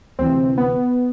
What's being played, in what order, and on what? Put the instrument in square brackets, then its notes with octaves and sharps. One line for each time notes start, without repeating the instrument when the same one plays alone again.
[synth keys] D2 C3 E3 C4
B3